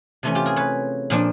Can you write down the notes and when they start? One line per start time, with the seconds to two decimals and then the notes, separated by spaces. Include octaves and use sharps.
0.23 C3 E3 A3 C#4
0.35 F4 G4
0.46 G#4 A#4
0.56 B4 C#5
1.10 A#2 F3 A#3 D4